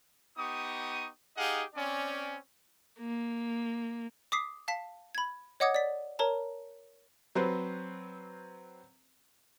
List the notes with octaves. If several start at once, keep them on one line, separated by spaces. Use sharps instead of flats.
B3 D#4 G4 C#6 D#6
D#4 G4 G#4 D#5 F5 F#5
C4 C#4 D5
A#3
D6 D#6 B6 C7
F5 A5 B6
B5 G#6
C#5 D#5 F#5 D6 D#6 G#6
D5 B6
A#4 C#5 A5 A#5
F#3 C4 B4 C5